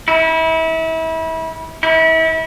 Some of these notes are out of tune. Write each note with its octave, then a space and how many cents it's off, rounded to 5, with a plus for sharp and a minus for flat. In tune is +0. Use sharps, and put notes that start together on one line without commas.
E4 -30
E4 -35